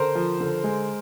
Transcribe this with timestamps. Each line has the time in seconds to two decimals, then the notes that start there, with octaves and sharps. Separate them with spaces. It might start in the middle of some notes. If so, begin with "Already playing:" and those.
Already playing: D3 A#4 C5
0.15 F3
0.40 D3
0.64 G#3